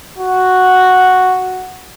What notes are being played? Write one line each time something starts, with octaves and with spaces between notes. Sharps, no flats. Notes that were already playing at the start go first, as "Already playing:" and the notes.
F#4